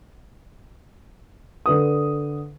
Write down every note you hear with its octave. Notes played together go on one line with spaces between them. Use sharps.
D3 B4 D#6